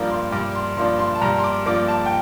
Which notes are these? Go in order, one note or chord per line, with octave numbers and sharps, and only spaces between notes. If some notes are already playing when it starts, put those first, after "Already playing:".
Already playing: G2 F3 A#3 D4 A#5
C6
G2 D6
C6
F3 A#3 D4 C6
C6
A5
G2 A#5
C6
D6
F3 A#3 D4 D6
A5
G5